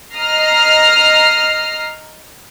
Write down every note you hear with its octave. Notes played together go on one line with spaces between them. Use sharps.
D#5 A#5 F6 C7